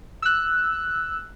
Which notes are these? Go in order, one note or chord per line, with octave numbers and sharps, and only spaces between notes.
E6 F#6